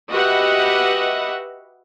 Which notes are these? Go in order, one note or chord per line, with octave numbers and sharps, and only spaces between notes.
F#4 G4 B4 D#5 E5 F#5